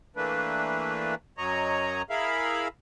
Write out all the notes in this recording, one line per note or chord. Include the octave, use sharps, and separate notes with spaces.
E3 A3 A#3 D4 B4
F#2 F#3 C#5 D#5 A#5
E4 G#4 A#4 E5 F5 B5